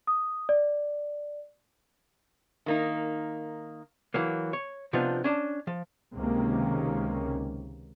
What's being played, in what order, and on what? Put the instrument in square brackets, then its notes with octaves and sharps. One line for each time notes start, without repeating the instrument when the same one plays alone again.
[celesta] D#6
D5
[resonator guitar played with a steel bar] D#3 A#3 D#4
[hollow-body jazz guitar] E3 F#3 A#3
C#5
C3 F3 B3 D4 D#4 F4
C#4 D4 A5
F3
[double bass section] C#2 C3 D#3 A#3 C#4